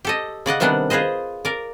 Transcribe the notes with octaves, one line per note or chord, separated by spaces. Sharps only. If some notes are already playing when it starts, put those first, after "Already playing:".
G4 A4 D#5
C#3 D5 D#5 F#5
C3 D#3 G3 B3 D4 F#5
F4 G#4 B4 C5 D#5
A#4 D5